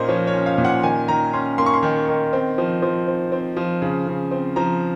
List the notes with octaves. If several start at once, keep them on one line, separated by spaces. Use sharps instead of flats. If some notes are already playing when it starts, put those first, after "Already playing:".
Already playing: A#2 A#3 C#4 C5 D#5
F3 C#5
C#5
C#4
F5
A#2
F#5
D#3 G#5
D#3 A#5
C#4 C6
A#3 C6
C#6
C6
D#3
D#3
C4
F3
F3
C4
C4
F3
C#3
C#3
C4
F3 A#5